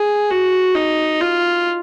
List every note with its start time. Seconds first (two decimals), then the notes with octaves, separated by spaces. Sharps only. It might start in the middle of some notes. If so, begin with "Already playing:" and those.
Already playing: G#4
0.31 F#4
0.75 D#4
1.21 F4